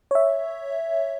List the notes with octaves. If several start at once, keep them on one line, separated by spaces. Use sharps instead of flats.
C#5 E5